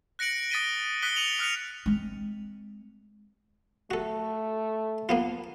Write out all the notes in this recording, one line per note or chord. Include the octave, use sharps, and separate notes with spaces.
F#6 A#6 C#7 D7 F#7
D#6 A6 B6 D#7 G7
D#6 F#6 B6 C#7 D#7 G7
D#6 C#7 D#7 F7 F#7
D#6 F6 F#6 B6 C#7 F7
G#3 C4
A3 F#4 A4
A#3 B3 F4